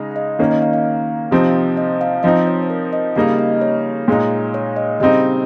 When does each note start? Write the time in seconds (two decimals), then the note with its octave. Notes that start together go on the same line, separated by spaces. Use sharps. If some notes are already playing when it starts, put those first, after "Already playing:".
Already playing: C#3 G#3 D#4
0.11 F5
0.16 D#5
0.39 D#3 A#3 C#4 F5
0.51 D#5
0.62 F5
0.73 F5
1.31 C3 F3 C4 D#4
1.77 D#5
2.01 F5
2.23 F3 C4 D#4 D#5
2.47 C#5
2.63 C5
2.70 A#4
2.93 D#5
3.16 C#3 G3 A#3 D#4 F5
3.39 D#5
3.61 C#5
4.08 A#2 G#3 D#4
4.54 C#5
4.76 D#5
5.00 C#3 G3 C4 D#4 D#5